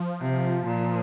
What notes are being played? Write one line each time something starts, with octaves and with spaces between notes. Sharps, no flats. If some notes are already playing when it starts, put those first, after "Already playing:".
Already playing: F3
C3
A#2